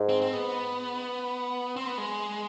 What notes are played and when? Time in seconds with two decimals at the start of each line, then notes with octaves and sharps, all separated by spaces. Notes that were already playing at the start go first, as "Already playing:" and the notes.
Already playing: G#2
0.09 C4
0.22 C4
0.33 B3
1.76 C4
1.87 B3
1.98 G#3